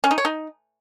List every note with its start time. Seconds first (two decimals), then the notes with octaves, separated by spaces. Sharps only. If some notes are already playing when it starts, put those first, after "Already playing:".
0.04 C#4
0.11 D#4
0.18 C#5
0.25 D#4